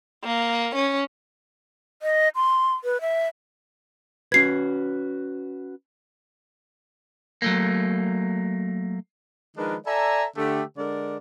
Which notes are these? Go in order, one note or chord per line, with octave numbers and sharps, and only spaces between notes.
A#3
C#4
D#5
C6
B4
E5
C#4 F#4 B4 G#6 C7
F#3 A3 A#3
D#3 F3 G#3 D4 A#4 B4
A4 D5 E5 G#5 A#5
D3 A3 G4
D3 G#3 A#4 D5